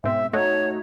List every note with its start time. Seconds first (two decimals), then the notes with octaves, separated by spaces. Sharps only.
0.04 G#2 B2 C4 E5
0.33 A3 D#4 F#4 C#5